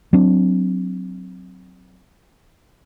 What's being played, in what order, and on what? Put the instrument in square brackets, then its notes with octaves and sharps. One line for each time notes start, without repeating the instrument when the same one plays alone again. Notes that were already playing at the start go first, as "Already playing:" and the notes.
[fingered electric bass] F#3 C4 D4